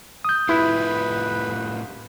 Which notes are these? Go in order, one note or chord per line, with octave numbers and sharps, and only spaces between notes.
D#6 G6
A2 E4 F4 G4 B4